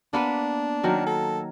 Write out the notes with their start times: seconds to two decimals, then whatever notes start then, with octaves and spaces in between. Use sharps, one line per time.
0.13 A#3 B3 D4 B4
0.83 D#3 F#3 A#4
1.07 A4